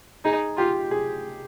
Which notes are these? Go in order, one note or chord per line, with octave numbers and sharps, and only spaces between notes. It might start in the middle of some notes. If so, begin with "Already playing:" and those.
D#4 G#4
F4 G4
G#4